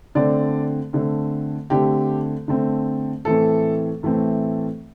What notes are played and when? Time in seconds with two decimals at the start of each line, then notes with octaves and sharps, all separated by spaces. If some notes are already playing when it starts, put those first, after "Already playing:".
0.15 D3 A3 C4 D5
0.93 D3 A3 C4
1.70 D3 A3 C4 G4
2.48 D3 A3 C4
3.25 A2 E3 A3 C4 A4
4.03 A2 E3 A3 C4